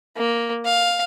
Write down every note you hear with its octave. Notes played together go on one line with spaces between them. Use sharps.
A#3
F5